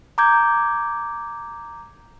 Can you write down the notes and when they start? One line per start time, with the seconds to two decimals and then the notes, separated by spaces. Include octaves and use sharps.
0.18 A#5 D6 G6 G#6